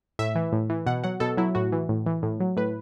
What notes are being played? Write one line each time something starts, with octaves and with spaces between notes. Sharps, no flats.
A2 E5
E3
A2
E3
B2 F#5
F#3 F#5
B2 A4
F#3 E4
A2 F#4
E3
A2
E3
A2
F#3
A2 B4